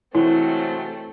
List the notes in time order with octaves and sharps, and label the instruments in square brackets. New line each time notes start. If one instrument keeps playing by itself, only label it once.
[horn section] G#2 C3 F#3 [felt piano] E3 [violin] A3 C4 [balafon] E4